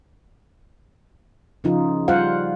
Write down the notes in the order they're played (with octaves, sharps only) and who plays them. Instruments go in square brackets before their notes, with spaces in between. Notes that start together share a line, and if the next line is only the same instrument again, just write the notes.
[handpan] C#3 F3 D#4 F4
G3 F4 C5 F5 F#5